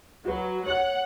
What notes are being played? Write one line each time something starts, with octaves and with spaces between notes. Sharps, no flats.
F#3 F#4 B4
C#5 F#5 F#6